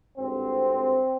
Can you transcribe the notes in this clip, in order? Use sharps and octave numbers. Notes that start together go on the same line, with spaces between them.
G#1 G2 D3 C4